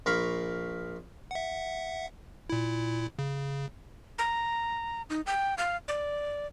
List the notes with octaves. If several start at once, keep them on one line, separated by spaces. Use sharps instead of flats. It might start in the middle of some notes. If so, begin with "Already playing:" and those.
A#1 A#4 F5 B5 C#6
E5 F#5
A#2 E4
C#3
A#5
D#4
G5
F5
D5